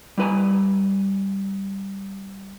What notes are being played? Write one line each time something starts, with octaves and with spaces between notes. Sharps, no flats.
G3 E4 B4 G#5 A#5